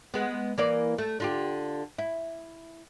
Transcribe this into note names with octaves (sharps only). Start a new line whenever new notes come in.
G#3 B3
E3 A#3 D5
A3
D3 F4 G4
E4